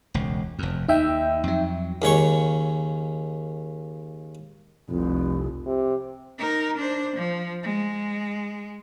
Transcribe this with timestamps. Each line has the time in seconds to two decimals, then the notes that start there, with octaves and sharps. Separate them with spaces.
0.14 E1 C#2
0.59 F1 F2
0.88 D#2 D#4 E5 G5
1.44 F2 F#3
2.02 D#2 C#3 C#5 C#6
4.90 F1 C2 F2
5.66 C3
6.39 D#4 A#4
6.77 D4 C5
7.16 F3
7.64 G#3